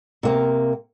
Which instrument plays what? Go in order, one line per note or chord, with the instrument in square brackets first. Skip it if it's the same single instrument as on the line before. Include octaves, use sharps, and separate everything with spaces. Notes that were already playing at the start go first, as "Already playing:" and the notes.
[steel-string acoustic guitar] C3 A#3